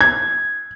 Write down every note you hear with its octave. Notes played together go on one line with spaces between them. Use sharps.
G#6